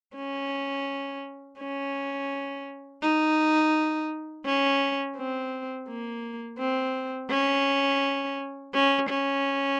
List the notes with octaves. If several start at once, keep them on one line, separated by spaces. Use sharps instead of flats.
C#4
C#4
D#4
C#4
C4
A#3
C4
C#4
C#4
C#4